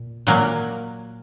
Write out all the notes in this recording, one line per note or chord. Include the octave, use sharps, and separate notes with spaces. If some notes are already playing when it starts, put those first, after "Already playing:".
Already playing: A#2
A#2 F#3 A#3